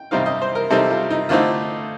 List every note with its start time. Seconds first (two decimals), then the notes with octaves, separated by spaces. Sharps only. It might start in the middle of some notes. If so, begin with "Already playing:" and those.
Already playing: G5
0.11 C3 G3 C4 D#4 F5
0.26 D#5
0.42 C5
0.55 A#4
0.70 C3 G3 C4 D#4 A4
0.90 F4
1.10 D#4
1.29 D3 A3 C4 D#4 F4